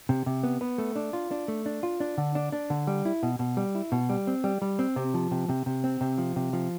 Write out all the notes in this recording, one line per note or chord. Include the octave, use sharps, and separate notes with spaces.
C3
C3
B3
B3
A3
D4
F4
D4
A3
D4
F4
D4
D3
D4
D4
D3
G3
E4
B2
B2
G3
E4
B2
G3
C4
G3
G3
C4
C3
F3
C3
C3
C3
C4
C3
F3
C3
F3